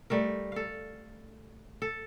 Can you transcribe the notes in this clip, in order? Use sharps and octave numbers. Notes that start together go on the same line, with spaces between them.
G3 A3 A#4
A4 F5
A4